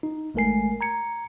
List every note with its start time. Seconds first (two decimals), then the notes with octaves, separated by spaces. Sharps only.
0.03 D#4
0.34 G#1 G#3 A3 A#4 G#5 C7
0.81 A#5 G#6 C#7